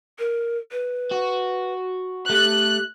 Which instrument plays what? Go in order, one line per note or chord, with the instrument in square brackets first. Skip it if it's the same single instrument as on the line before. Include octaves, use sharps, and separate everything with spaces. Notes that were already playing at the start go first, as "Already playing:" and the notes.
[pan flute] A#4
B4
[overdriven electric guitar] F#4
[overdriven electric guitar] A3 [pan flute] G4 [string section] F#6